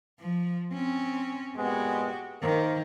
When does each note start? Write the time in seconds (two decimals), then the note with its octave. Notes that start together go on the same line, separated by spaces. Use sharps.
0.20 F3
0.74 C4 C#4
1.57 A#2 G#3 B3 F#4 G4
2.42 D#3 A#3 A#4 C5